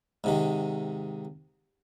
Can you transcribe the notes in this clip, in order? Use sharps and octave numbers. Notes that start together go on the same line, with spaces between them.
G#2 C3 D#3